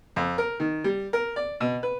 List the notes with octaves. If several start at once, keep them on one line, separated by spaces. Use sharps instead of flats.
F2
A#4
D#3
G3
A#4
D5
B2
B4